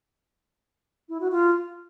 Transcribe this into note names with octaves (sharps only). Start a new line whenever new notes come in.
E4
F#4
F4